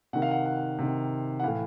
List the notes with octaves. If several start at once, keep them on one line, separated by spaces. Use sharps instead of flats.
C3 D#3 F#5
F5
F#5
F#5
C3 D#3
F#5
A2 E3 F5